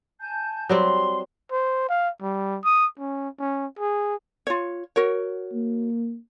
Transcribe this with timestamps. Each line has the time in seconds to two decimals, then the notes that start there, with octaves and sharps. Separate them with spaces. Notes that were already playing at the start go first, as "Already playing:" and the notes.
0.20 G#5 A5 G6
0.69 F#3 G3 C4 C6
1.51 C5
1.89 F5
2.22 G3
2.64 D#6
2.98 C#4
3.39 C#4
3.79 G#4
4.47 F4 C#5
4.96 F#4 A#4 C#5
5.53 A#3